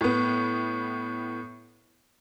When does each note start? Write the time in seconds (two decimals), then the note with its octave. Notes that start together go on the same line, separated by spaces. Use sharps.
0.01 A2 B3